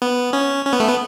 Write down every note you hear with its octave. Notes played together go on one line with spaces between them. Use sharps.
B3
C#4
C#4
B3
A3
B3